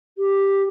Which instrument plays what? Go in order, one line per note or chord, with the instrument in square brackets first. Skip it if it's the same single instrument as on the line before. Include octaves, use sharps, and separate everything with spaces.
[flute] G4